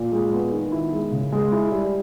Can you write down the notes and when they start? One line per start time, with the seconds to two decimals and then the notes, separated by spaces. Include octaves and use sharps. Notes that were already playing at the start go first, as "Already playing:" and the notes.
Already playing: A#2
0.12 G#3
0.33 B3
0.52 D#3
0.72 E4
0.92 G#3
1.12 C#3
1.32 G#3
1.52 E4
1.72 G3